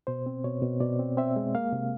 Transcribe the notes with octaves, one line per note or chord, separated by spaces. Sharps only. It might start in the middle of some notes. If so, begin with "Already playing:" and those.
B2 C5
C4
B2 C#5
B2
B2 D5
C4
C4 E5
G#3
A#3 F5
C3